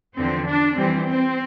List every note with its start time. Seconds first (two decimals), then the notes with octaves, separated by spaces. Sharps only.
0.16 E2 D3 F3 C4
0.47 D4
0.76 F2 E3 G3 C4
1.05 C4